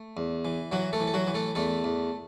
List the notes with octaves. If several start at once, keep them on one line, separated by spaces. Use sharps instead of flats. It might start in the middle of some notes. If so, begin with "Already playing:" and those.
Already playing: A3
E2
E3
E3 F#3 F#4
A3 A4
E3
A4
F#3 F#4
E3
A3 A4
E2 A3 A4
E2